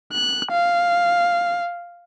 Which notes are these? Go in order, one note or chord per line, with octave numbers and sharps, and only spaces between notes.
F#6
F5